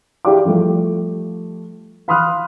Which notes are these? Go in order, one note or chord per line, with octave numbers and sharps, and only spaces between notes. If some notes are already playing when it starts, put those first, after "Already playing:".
E4 G4 G#4 D5 F5 D6
F3 G3 A3
F5 B5 C6 D#6 F6 F#6